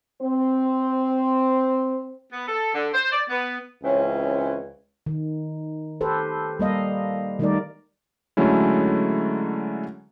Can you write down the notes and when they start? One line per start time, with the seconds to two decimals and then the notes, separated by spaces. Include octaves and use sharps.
0.22 C4 C5
2.31 B3
2.47 A4
2.74 D3
2.93 C5
3.11 D5
3.30 B3
3.83 C#2 E3 C4 C#4
5.06 D#3
6.01 G4 A4 B4 C5
6.59 G3 A#3 D#5 F5
7.39 D#3 G3 A3 D#4 A#4 D5
8.37 D3 F#3 G#3 A3 C#4 E4